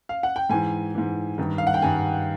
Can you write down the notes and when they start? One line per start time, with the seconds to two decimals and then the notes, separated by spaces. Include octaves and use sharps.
0.09 F5
0.23 F#5
0.36 G5
0.49 G#2 E3 G#5
0.95 G#2 E3
1.38 G2 D#3
1.58 F5
1.67 F#5
1.74 G5
1.82 G2 D#3 G#5